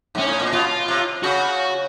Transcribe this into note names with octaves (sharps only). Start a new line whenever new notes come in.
G#2 C#4
A2
A#2
B2 F4
C3
C#3 F#4